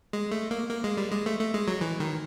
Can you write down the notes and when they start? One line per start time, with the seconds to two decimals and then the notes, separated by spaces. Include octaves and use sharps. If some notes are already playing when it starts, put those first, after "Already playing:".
0.13 G#3
0.32 A3
0.51 A#3
0.70 A#3
0.84 G#3
0.97 G3
1.12 G#3
1.26 A3
1.39 A3
1.54 G#3
1.68 F#3
1.81 E3
2.00 D#3